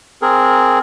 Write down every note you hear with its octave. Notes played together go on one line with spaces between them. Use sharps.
C4 G#4 A#4